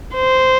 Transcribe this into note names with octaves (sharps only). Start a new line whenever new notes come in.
C5